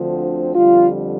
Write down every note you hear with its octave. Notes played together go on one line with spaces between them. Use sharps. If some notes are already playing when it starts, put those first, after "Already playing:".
Already playing: D2 D3 F3 C4
F2 D3 G3 F4